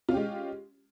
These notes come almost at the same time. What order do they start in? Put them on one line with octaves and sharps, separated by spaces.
F4 C#4 G4 G#3